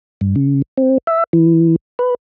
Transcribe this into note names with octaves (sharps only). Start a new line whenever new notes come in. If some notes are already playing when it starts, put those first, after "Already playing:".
G2
C#3
C4
E5
E3
B4